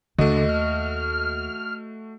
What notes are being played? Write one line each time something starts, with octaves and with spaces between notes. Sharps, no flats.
D#2 D3 A3 F#4 D#5
F6